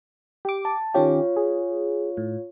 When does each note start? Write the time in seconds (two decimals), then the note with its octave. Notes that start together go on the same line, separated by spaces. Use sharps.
0.45 G4 D6
0.65 A5
0.94 D#3 C#4 F4 G4 C#5 F5
1.37 G#4
2.17 A2